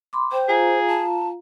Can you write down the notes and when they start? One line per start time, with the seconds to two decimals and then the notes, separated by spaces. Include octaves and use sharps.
0.13 B5 C6 D6
0.32 C5 G5
0.49 F4 G#4 F5 A#5
0.88 A5